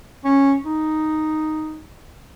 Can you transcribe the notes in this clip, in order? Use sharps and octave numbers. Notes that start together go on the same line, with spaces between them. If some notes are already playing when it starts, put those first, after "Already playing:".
C#4
D#4